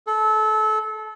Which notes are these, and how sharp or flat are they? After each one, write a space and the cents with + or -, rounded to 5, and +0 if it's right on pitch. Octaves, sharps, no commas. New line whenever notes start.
A4 -25